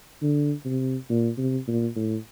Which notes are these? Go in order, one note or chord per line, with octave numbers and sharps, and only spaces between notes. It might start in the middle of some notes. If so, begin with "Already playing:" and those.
D3
C3
A#2
C3
A#2
A2